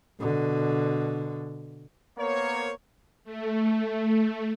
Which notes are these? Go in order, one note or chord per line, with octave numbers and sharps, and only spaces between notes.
B2 D3
A#3 B3 A#4 C5 C#5
A3